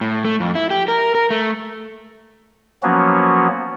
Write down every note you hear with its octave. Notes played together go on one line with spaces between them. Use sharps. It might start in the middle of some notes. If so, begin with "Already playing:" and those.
A2
A3
F2
E4
G4
A#4
A#4
A3
F3 F#3 A#3 B3 C#4 F#4